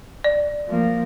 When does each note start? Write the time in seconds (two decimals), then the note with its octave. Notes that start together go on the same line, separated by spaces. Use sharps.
0.24 D5
0.68 F3 A#3